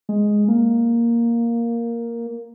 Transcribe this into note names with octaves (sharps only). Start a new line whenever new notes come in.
G#3
A#3